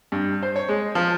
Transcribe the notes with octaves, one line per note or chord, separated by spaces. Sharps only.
G2
C5
C#5
G#3
F3